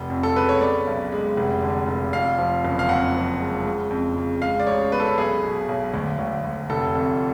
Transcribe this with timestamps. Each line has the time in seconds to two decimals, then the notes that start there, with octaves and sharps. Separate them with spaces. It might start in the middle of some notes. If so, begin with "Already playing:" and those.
Already playing: F1
0.10 F2
0.23 A4
0.36 C#3 B4
0.49 C#5
0.61 B3 D5
0.87 B1
1.12 G#3
1.37 F1
1.62 D3
1.88 F1
2.13 F2 F5
2.38 F3
2.65 F#1
2.79 F5
2.89 F2 F#5
3.15 F3
3.40 G#3
3.65 C#3
3.90 F2
4.16 C#3
4.41 G#3 F5
4.60 D5
4.67 A1 C#5
4.92 B3 B4
5.00 A4
5.07 B4
5.18 B1 G#4
5.43 B2
5.68 B1
5.94 D2
6.19 D2
6.44 D2
6.70 F1 A4
6.95 F2